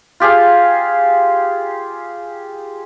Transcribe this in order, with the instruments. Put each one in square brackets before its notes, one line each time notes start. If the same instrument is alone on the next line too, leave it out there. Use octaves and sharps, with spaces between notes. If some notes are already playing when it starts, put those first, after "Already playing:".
[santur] F4 G4 G#4 F5